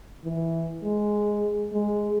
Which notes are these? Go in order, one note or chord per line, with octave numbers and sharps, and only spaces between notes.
E3
G#3
G#3